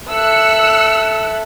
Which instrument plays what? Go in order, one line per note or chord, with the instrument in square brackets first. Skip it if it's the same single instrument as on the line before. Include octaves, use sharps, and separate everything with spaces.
[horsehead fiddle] A4 E5 [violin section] E6 F#6 C#7